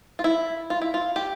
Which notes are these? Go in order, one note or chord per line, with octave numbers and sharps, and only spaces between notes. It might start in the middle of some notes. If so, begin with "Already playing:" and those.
F4
E4
F4
E4
F4
G4